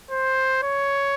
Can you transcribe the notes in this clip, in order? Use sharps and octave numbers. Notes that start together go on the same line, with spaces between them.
C5
C#5